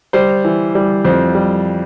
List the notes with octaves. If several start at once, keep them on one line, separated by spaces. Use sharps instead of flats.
G3 C5
E3
G3
F2 C5
G3